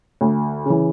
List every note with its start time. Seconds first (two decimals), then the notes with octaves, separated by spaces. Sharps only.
0.21 D2
0.66 C#3 E3